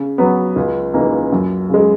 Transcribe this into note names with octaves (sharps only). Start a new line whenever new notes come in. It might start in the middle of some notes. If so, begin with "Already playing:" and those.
Already playing: C#3
F#3 B3
C#2
C#3 E3 A#3 D#4
F#2
C#3 G#3